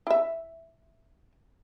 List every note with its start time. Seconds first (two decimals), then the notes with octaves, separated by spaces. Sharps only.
0.07 E4 E5